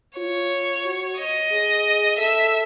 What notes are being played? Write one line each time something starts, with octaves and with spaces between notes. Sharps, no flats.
F4 C#5
F#4
D#5
G#4
A4 E5